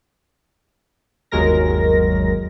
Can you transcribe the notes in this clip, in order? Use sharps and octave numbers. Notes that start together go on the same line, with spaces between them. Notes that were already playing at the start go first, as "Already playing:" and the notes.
G1 D#2 F#3 G#3 A#4 A#6